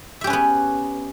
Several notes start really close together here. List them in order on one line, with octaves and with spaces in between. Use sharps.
E5 G4 C#4 B4 B3